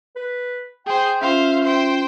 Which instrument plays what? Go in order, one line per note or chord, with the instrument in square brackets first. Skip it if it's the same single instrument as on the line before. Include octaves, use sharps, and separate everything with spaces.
[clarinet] B4
[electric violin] G#4 C5 [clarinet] G5
[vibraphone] C#4 F4 [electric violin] C5 F5 [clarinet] E5
[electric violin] C5 G5